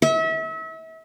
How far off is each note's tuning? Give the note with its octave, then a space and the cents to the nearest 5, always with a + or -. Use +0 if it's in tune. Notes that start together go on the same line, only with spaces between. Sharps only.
E5 -35